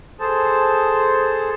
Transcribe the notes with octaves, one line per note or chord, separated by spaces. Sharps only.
G#4 A4 C5 A5